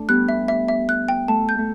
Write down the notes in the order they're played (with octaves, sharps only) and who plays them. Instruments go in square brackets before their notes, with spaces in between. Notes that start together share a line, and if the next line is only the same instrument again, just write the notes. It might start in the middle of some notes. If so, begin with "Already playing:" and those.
Already playing: [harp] A3 D4
[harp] G3 B3 [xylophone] F#6
[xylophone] E5
E5
E5
F#6
G5
[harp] A3 [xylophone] A5
[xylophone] G6
[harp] A3